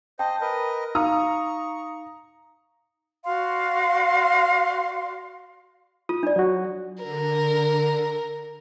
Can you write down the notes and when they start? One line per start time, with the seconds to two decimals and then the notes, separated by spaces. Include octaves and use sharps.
0.19 C5 D#5 G5 A5
0.41 A#4 B4 D#5
0.95 D#4 F5 A#5 C#6 D#6
3.25 F#4 D5 F5 C6
6.09 F4 D#6
6.23 D4 D5
6.36 F#3 F#4
7.03 D3 A#4